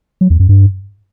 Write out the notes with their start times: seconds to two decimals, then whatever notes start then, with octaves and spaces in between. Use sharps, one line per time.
0.21 F#3
0.30 E2
0.40 F#2
0.49 G2